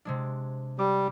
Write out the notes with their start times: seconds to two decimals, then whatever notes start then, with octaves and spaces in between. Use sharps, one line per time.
0.05 C3 G#3 D4
0.79 G3 D6